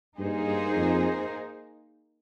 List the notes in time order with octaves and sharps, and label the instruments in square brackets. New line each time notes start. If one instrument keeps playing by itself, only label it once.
[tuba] G2 [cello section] A#3 D#4 G#4 C5
[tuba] G2
F2